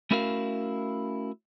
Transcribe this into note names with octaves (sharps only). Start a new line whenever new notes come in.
A3 C#4 E4 F#4 A#4 F5